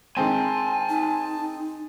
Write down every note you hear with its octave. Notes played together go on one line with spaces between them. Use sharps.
D#3 G#3 C4 G#5 A5
D#4